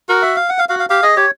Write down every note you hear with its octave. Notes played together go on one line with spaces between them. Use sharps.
F#4 A#4
E5
F5
F#5
F5
F#4 F5
F5
G4 F5
G#4 D#5
G4 C#5